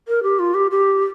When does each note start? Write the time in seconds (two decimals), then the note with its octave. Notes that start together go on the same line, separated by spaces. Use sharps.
0.08 A#4
0.23 G4
0.39 F4
0.54 G4
0.71 G4